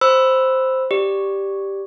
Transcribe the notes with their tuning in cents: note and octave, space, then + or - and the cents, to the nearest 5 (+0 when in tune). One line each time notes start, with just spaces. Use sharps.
C5 +0 B5 +0 E6 +0
G4 +0 D5 +0